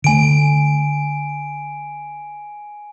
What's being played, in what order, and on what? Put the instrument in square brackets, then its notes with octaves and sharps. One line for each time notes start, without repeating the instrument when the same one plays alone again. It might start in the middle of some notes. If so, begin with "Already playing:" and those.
[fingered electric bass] D3 A3 [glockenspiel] G#5 D7